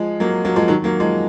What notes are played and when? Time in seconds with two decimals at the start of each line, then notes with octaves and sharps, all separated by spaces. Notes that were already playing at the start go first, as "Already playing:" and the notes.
Already playing: F3 G#3
0.20 F#3 A#3
0.45 F#3 A#3
0.56 F3 G#3
0.68 D#3 F#3
0.84 F#3 A#3
1.00 F3 G#3